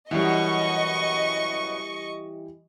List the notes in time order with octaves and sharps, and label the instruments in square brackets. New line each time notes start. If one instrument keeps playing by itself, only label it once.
[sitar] F#2 B2 [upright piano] E3 G3 [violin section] D#5 C#6